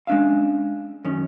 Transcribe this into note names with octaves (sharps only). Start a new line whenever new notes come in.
G#3 C#4 D4 E5 F5
F#2 D#3 C#4